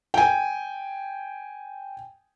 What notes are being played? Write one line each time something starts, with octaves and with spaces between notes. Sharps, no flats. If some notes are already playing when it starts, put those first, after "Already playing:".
G5 G#5